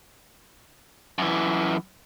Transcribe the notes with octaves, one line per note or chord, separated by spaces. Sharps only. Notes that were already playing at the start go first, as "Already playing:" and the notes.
F#2 E3